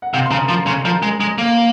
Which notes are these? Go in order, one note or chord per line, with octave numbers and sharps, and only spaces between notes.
F#5
C3 F5
C6
C#3 A#5
F3 C6
C#3 C6
F3 A#5
G#3
G#3
A#3